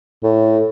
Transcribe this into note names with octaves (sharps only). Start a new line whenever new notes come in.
A2